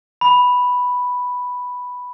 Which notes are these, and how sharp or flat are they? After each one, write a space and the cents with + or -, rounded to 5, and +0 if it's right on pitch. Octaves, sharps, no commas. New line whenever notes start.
B5 +0